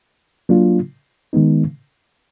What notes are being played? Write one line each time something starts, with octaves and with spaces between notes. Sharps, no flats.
F#3 A#3 D4 F4
D#3 G#3 B3 D#4